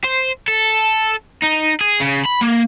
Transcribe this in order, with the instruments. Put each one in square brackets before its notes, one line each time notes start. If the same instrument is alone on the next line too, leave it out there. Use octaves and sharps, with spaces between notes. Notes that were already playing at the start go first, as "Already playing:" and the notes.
[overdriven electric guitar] C5
A4
D#4
G#4
C#3
B5
A#3